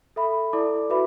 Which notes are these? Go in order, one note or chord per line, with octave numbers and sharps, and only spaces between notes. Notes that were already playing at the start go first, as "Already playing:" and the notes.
A4 E5 B5
E4 A4 D5 A5 D6
F#4 B4 E5 B5 D6